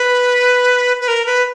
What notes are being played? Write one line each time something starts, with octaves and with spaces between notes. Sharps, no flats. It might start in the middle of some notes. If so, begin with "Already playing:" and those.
Already playing: B4
B4
A#4
B4